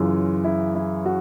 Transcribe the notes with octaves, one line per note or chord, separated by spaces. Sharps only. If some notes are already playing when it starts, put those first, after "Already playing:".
Already playing: F#2 C#3 E3 F4
E4
E4
F#4